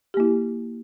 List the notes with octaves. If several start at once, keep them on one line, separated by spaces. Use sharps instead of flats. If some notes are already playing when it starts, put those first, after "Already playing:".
A#3 E4 G4